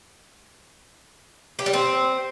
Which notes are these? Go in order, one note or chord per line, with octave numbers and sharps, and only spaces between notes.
G4
G3
C4